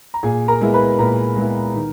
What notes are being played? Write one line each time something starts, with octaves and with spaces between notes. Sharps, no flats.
A#5
A#2 G#4 G#5
A#4 A#5
G#3 B3 E4
B4 B5
A#2 A#4 A#5
G#3 B3 E4
D#3